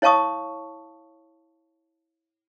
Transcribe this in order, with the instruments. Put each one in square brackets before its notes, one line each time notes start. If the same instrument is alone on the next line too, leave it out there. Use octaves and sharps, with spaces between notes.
[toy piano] E4 C#5 F5 A5 C#6 D#6